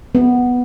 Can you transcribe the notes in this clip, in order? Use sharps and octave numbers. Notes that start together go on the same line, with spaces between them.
B3